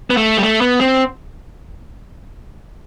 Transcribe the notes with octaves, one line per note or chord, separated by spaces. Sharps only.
B3
A3
G3
A3
B3
C4